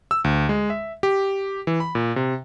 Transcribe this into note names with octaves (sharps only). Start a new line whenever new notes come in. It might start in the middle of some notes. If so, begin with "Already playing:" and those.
E6
D2
G#3
E5
G4
E3
B5
A#2
C3